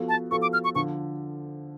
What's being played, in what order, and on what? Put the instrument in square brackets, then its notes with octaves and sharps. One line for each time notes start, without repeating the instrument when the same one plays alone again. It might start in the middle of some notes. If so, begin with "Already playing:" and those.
Already playing: [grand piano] F3 B3 F#4 A4
[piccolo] A5
[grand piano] F3 B3 F#4 A4 [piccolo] C#6
[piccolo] D6
F6
C#6
[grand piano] D3 F3 [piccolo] C#6